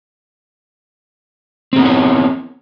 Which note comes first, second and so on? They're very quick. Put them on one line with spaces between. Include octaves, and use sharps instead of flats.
C4 G#4 B3 E4 C#5